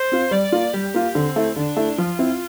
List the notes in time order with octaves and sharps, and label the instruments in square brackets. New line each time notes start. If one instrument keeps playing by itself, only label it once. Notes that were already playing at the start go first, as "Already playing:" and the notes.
Already playing: [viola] C5
[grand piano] C4 F4
[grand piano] G3 [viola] D5
[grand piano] A#3 F4
[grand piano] G3 [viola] G4
[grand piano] A#3 F4
[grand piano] D3 [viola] C4
[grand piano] A3 E4
[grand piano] D3 [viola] D4
[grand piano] A3 E4
[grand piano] F3 [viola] F4
[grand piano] C4 E4